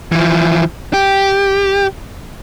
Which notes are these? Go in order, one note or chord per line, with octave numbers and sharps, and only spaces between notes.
E3 F3
G4